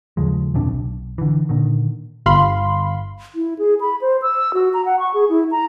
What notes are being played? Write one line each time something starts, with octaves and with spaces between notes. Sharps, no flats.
D#2 C#3 F3 G#3
D#1 F#2 C3 D4
B1
D3 E3
A#2 D3 D#3
G1 F5 B5 C6
E4
G#4
B5
C5
E6
F#4
A#5
F#5
C#6
G#4
E4
A#5